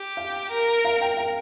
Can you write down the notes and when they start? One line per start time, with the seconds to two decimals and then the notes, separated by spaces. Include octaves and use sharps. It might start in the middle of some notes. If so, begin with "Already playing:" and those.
Already playing: G4
0.17 F5
0.51 A#4
0.85 F5
1.01 G5
1.17 F5